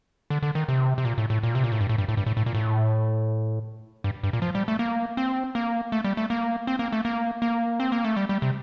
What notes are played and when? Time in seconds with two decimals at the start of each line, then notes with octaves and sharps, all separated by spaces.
0.30 D3
0.43 D3
0.55 D#3
0.68 C3
0.98 C3
1.05 A#2
1.18 A2
1.30 A2
1.43 A#2
1.55 C3
1.64 A#2
1.72 A2
1.81 G2
1.89 A2
1.98 G2
2.08 A2
2.17 G2
2.26 A2
2.37 A2
2.46 A#2
2.55 A2
4.04 G2
4.23 G2
4.33 A#2
4.42 F3
4.55 G3
4.68 A3
4.79 A#3
5.17 C4
5.55 A#3
5.92 A3
6.04 G3
6.17 A3
6.30 A#3
6.67 C4
6.79 A#3
6.92 A3
7.05 A#3
7.42 A#3
7.80 C4
7.92 A#3
8.04 A3
8.16 G3
8.29 G3
8.42 C3